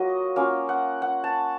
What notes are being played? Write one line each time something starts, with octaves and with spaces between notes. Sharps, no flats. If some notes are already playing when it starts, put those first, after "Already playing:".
Already playing: F#3 A#3 F4 F#4 D#5
A#3 C#4 F4 F5
F#5
F#5
A5